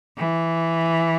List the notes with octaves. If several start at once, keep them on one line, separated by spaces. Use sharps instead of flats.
E3